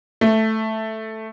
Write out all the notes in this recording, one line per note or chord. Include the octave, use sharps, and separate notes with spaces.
A3